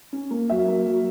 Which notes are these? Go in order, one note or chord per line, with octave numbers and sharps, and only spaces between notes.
C#4
A#3
F#3 E5
A#3
F#3